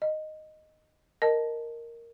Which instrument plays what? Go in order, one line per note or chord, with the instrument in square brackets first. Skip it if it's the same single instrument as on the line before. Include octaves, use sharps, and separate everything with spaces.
[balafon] D#5
[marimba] A#4 [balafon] D#5 A5